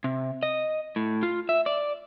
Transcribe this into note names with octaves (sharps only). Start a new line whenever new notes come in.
C3
D#5
A2
F4
E5
D5